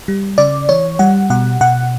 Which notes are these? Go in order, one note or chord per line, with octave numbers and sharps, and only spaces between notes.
G3
C#3 D5
E3 C#5
G3 F#5
B2 F#5
B2 F#5